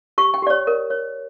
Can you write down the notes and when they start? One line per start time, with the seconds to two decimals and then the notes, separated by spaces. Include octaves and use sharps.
0.18 G4 C#6
0.34 G5
0.42 G4 D5
0.50 C#5
0.67 A#4
0.90 C#5